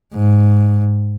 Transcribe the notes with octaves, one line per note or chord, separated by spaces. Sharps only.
G#2